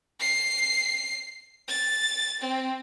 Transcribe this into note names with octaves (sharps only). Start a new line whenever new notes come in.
C7
A6
C4